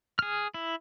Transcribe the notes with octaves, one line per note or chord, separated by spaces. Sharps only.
G#4 F6
E4